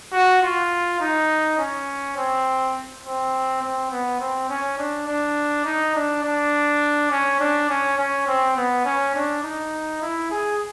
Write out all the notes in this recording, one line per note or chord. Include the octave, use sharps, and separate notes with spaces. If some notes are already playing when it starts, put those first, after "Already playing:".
F#4
F4
D#4
C#4
C4
C4
C4
B3
C4
C#4
D4
D4
D#4
D4
D4
C#4
D4
C#4
C#4
C4
B3
C#4
D4
D#4
E4
G#4